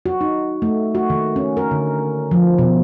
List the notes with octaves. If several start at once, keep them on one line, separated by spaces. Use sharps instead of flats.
F#4
D#4
A3
F#4
D#3
C#4
A#4
D3
F3
B2